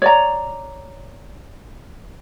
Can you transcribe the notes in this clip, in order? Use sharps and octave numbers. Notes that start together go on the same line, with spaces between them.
C#5 D5 A#5